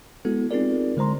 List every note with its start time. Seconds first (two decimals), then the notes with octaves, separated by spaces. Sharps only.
0.25 G#3 B3 E4 F#4 A4
0.51 C4 D#4 F4 G#4 A#4 D5
0.97 D3 G#3 C5 A#5 C6